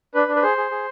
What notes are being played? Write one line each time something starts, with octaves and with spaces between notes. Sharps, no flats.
D4 B4
D4
B4
G#4 C5
G#4
G#4